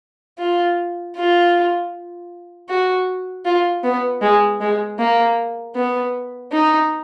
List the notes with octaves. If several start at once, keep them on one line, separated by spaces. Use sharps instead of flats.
F4
F4
F#4
F4
B3
G#3
G#3
A#3
B3
D#4